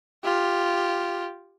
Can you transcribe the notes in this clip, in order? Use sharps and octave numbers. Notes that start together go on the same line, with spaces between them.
F4 G4